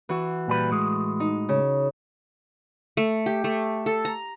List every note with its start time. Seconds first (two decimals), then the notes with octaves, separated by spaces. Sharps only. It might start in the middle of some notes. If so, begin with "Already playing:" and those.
0.09 E3 F#4
0.48 A#2 G3 B4
0.71 A2 G#3
1.20 D#4
1.49 C#3
2.97 A3
3.26 G4
3.44 A3
3.86 A4
4.05 A#5